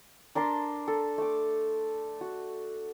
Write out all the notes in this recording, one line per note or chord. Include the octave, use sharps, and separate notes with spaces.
D4 A#4 A5 C6
A4
A3 D6
F#4